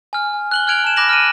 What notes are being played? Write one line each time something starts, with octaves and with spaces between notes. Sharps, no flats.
G#5 F6
F#6 F#7 G7
F6 F#6 G#6 D7 F7 F#7
A5 E7
B5 D6 F#6 A#6 E7 F#7
F6 D7 D#7